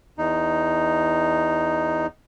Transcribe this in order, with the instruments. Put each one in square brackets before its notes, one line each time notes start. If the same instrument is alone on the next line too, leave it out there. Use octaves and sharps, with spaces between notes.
[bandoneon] E2 D#4